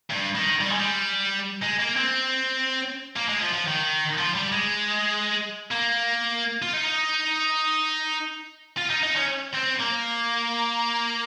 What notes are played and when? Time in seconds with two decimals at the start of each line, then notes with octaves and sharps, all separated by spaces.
0.10 G2
0.35 D#3
0.61 G3
0.70 G#3
0.79 G3
1.63 G#3
1.80 A#3
1.97 C4
3.17 A#3
3.29 G#3
3.41 F3
3.54 F3
3.68 D#3
4.18 F3
4.35 G3
4.52 G#3
5.71 A#3
6.62 F4
6.74 D#4
8.77 F4
8.90 D#4
9.03 D#4
9.16 C#4
9.54 C4
9.79 A#3